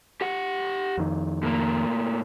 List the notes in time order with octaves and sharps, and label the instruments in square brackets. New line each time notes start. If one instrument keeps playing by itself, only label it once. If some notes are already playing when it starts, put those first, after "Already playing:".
[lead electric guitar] G4 F#5
[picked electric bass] F2 D#3
[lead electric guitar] A2 A#3